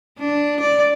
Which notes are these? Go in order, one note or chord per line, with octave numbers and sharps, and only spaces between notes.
D4
D5